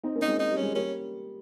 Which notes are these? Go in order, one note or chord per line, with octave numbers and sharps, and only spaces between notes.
C4 D#4
A#3 C#4
D#4
G#3 C4
D#4
G3
C#4
G#3
G3 A#3 C#4